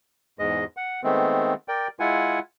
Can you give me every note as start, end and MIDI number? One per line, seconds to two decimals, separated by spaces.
0.39 0.65 40
0.39 0.65 44
0.39 0.65 56
0.39 0.65 75
0.77 1.01 78
1.04 1.54 51
1.04 1.54 56
1.04 1.54 57
1.04 1.54 59
1.04 1.54 60
1.68 1.88 70
1.68 1.88 74
1.68 1.88 79
2.00 2.39 56
2.00 2.39 64
2.00 2.39 65
2.00 2.39 78
2.00 2.39 80